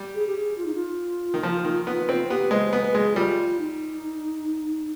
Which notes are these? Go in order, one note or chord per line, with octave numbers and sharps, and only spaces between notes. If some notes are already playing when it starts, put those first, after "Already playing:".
Already playing: G3
G#4
G4
G#4
F4
D#4
F4
D#3
F3
D#3
B3
C4
B3 G4
G#3 C5
B3 B4
B4
G#3 G#4
G3 F4
D#4